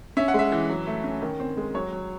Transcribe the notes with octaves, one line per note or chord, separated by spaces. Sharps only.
C#4 E5
F#5
G#3 E5
E3
F#3
A3
C#4
D#3
C4
G#3
F#3 C#5
F#3